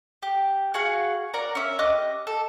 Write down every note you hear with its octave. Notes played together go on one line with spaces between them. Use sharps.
G4
F#4 G#4 F5 F#5
A#4 D5 F#5 A#5
C#4 E5
G4 D#5 D6 F#6
A4